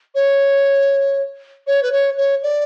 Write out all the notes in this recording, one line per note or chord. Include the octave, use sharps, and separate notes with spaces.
C#5
C#5
B4
C#5
C#5
D5